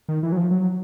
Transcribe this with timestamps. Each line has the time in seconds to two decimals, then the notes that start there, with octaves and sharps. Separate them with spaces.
0.09 D#3
0.23 E3
0.32 F#3
0.37 F3
0.51 F#3